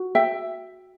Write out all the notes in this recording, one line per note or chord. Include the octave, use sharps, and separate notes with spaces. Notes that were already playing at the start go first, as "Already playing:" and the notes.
Already playing: F#4
E5 G5